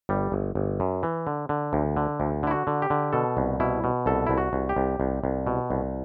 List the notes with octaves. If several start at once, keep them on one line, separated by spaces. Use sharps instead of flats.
G1 G3
G1
G1
F#2
E3
D3
D3
D2
D3
D2
D3 E4
F#4
D3
G4
D3
B2 A4
C2
B2 E4
B2
C2 A4
C2 E4
F#4
C2
G4
C2
C2
C2
B2
C2